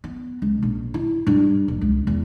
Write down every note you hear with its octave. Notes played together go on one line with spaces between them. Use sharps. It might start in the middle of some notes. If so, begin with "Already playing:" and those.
B3
C#2
A#1
E4
G2
D#1
C#2
E2